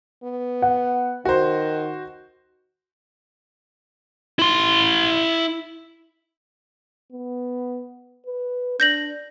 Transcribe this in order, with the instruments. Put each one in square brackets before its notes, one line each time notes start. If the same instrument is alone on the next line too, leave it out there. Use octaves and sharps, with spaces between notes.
[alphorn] B3
[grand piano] F#5
[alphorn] D#3 [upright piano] F#4 C5
[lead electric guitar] E4 C6
[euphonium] B3
B4
[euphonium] D4 [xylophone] G6 A#6 F#7